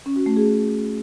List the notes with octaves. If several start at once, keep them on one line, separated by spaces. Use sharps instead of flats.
C#4
F#4
A3
G#4